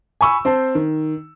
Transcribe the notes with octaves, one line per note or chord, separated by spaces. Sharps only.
G#5 B5 C#6 E6
C4 C5 A5
D#3